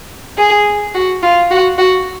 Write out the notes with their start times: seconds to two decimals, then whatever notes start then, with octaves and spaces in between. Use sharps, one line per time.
0.38 G#4
0.94 F#4
1.22 F4
1.50 F#4
1.78 F#4